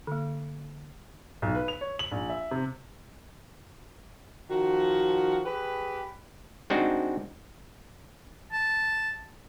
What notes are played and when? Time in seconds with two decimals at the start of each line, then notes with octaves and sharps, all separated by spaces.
0.07 D3 A#3
1.42 B1
1.55 B4
1.68 F7
1.81 C#5
1.99 F#7
2.11 A#1
2.30 E5
2.51 C3
4.51 D#3 F3 F#4
5.46 G4 G#4 B4
6.70 G#3 C4 D4 D#4 F#4
8.52 A5